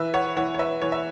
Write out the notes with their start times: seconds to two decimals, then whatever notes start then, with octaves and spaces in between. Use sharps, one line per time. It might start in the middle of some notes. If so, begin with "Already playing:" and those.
Already playing: E3 B4 E5
0.14 C#5 F#5
0.36 E3 C#5 F#5
0.54 C#5
0.59 B4 E5
0.82 E3 C#5
0.92 E5